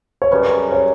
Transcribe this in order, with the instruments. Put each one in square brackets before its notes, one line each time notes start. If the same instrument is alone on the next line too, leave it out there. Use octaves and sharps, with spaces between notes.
[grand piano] C#5
[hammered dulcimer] F#2 C#3 G3 C#4 [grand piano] B4
[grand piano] C#5